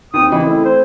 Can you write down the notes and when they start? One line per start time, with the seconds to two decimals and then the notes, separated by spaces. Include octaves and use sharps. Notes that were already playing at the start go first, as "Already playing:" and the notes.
0.14 D#2 C4 D#6
0.32 C#3 E3 D#4 E4
0.44 A3 C4
0.64 C5